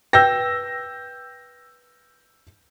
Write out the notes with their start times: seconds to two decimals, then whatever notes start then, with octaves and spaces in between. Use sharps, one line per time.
0.13 B4 G5 E6 G6 A#6